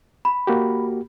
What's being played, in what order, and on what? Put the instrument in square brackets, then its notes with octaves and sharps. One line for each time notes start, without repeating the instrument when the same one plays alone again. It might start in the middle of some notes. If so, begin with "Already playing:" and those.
[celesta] B5
[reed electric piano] A#3 F#4 G4